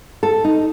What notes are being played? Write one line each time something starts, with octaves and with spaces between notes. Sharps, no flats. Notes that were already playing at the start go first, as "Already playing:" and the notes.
A4
D#4